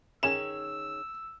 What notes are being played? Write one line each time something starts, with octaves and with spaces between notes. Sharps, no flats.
D#3 C#4 G#4 E6 E7